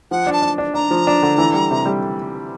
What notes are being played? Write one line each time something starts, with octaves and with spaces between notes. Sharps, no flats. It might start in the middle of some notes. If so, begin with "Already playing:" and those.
F3 F#5
D4
A5
D4
D4
D4 A#5
F3
D4
D3
E3
G3
C3
G3